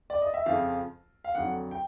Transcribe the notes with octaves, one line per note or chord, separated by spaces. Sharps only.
D5
D#5
E5
F2 C#3 F3 F5
F5
F2 D3 F#3 F#5
G5